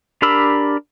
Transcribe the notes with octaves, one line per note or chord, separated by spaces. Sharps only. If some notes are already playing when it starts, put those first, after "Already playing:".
D4 G4 A#4 B5 E6